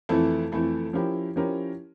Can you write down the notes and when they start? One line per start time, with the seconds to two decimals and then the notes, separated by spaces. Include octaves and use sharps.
0.09 F2 E3 A3 E4 A4
0.52 F2 E3 A3 E4 A4
0.93 F3 C#4 E4 G4 A#4
1.36 F3 C#4 E4 G4 A#4